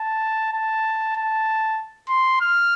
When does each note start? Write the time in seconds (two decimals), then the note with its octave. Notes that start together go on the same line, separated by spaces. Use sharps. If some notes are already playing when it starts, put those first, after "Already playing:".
Already playing: A5
0.53 A5
1.16 A5
2.09 C6
2.41 F6